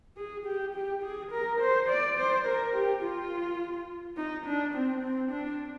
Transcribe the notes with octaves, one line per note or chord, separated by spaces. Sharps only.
G#4
G4
G4
G#4
A#4
C5
D5
C5
A#4
G4
F4
D#4
D4
C4
C4
D4